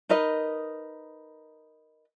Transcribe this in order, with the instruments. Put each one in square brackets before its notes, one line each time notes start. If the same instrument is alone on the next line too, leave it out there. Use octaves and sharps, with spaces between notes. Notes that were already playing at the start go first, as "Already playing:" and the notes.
[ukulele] D#4 A#4 B4 D#5